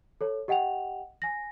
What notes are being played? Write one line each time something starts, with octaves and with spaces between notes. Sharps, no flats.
A4 C#5
G4 D#5 F#5 G5 F7
G#5 A#6